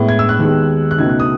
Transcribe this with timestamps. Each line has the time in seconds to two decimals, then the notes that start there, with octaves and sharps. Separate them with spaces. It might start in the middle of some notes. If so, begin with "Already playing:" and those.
Already playing: A2 G#3 B3 E4
0.09 G#6
0.19 E6
0.29 F#6
0.39 D#2 D#3 G#3 B3
0.91 F#6
0.98 C#2 B2 A3 D#4 G#6
1.09 F#6
1.20 D#6